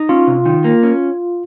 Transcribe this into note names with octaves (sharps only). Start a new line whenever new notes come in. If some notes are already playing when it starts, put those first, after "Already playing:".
Already playing: D#4
C#4 F4
C3
D#3
A#3
C#4